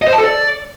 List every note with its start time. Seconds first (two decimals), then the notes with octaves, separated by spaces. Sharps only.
0.02 D#5
0.07 C5
0.13 A5
0.18 A4
0.24 D5